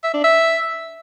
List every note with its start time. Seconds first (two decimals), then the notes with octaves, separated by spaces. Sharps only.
0.04 E5
0.14 D4
0.24 E5